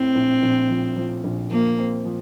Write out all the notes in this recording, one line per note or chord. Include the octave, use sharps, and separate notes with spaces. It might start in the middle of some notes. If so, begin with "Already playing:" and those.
Already playing: A2 C4
A#1
A#1
F3
F3
A#1
F3 A#3
C4
F3